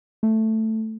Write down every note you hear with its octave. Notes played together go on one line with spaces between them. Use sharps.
A3